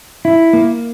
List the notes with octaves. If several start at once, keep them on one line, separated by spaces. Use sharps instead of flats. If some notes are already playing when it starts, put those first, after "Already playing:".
E4
A#3